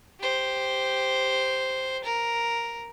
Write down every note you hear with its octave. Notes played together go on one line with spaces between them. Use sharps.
G4 C5
A#4